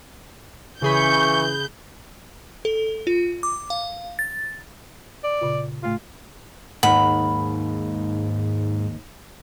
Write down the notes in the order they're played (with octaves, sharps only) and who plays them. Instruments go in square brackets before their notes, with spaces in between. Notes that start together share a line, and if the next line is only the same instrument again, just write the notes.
[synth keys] C#3 G#4 B5 [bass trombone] E3 [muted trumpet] C#6 [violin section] G6
[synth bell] A4
F4
D6
F5
A6
[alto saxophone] D5
[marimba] A#2 C#3 F4
[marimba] A2 A3 [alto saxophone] F4
[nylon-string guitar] D#2 [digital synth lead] G#2 [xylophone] F#5 [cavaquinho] B5